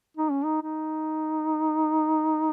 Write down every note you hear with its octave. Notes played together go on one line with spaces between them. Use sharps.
D#4
C#4
D#4
D#4